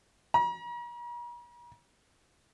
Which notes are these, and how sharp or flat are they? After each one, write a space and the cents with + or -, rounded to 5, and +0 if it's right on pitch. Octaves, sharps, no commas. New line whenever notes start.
A#5 +45